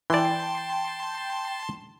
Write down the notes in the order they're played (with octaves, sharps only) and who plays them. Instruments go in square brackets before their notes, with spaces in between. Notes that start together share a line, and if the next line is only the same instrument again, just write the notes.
[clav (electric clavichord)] E3 D5 [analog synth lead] G5 [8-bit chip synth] A5 C6